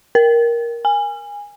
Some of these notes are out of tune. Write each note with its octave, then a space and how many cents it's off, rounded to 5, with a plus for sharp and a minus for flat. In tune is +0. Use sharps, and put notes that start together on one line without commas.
A#4 +10
G#5 -20